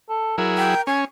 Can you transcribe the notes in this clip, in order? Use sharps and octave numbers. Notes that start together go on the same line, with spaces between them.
A4
F#3 E4 G#4 A#4
G5
C#4 G#5